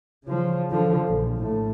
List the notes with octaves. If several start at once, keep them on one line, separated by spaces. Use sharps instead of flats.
C#3 F3
D3 F3
A#1
A2 A3